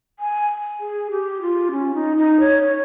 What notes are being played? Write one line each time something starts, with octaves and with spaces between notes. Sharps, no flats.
G#5
G#4
G4
F4
C#4
D#4
D#4
C#5
C#5